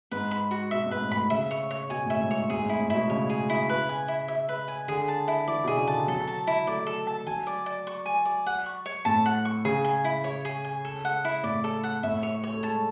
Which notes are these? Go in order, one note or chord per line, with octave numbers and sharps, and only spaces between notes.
G#2 B4
B5
F#4
B2 E5
G#2
B4
A2
A2 B5
C#3 E5
C#5
C#5
B2 G#5
A2 E5
G#2
C#5
G#2 G#4
A2 E4
A2
B2 E4
C#3 C#5
G#4
E4
B4
G#5
E4
E5
B4
G#5
D3 G#4
A5
E4
E3 D5
B2 G#4
C#3
D3 A5
E3
F#3 A4
A5
E4
A3 D5
A4
A5
F#3 G#5
D5
D5
C#6
G#5
D5
F#5
C#6
C#5
A2 A5
F#5
C#6
C#3 G#4
G#5
E4
C#5
G#4
G#5
A4
F#5
E4
A2 D5
A4
F#5
A2 E5
C#5
C#5
A3
G#3 A5